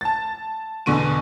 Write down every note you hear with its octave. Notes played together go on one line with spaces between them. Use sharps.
A5 A6
E2 B2 D3 C#6 D#7